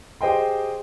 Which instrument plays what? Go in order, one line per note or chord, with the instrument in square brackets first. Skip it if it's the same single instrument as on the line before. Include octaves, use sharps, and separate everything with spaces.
[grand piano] G4 G#4 C5 D#5 G5 C6